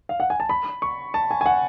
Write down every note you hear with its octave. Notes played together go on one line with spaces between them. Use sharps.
F5
F#5
G#5
A5
B5
C#6
A5
G#5
G#5
F#5